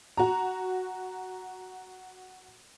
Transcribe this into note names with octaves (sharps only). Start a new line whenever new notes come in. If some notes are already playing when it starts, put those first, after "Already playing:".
F#4 A#5